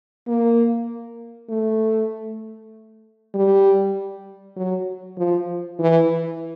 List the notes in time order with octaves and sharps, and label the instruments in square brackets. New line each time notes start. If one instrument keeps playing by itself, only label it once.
[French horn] A#3
A3
G3
F#3
F3
E3